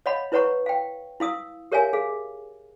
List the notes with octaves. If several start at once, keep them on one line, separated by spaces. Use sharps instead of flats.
C#5 D#5 F5 F#5 B5
E4 B4 C#5 F#5 A#5 C#6
F5 G5
E4 F5 D#6 E6
G4 A#4 C#5 E5 F5 G#5
G#4 F5